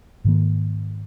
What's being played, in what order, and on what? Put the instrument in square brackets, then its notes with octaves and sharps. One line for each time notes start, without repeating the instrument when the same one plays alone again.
[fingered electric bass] G#2 D#3 A#3